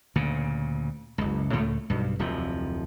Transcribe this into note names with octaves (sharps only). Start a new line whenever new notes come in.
D2 A#2 C#3
F#1 C#2
C#2 A2 A3
B1 G2
D1 F2 C3 F3